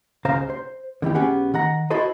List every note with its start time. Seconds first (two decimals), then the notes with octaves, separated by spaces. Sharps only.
0.25 C#2 C#3 C5 F5 A#5
0.50 C5
1.02 D3 D#3 E4 G4
1.15 B1 B3 C#4 G4 G#4 F#5
1.54 D#3 F#5 A#5
1.90 E4 F#4 A4 C5 D#5